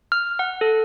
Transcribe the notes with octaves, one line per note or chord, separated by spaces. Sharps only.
F6
F#5
A4